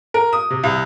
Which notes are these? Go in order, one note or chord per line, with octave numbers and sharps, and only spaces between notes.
A#4
D#6
C3
C2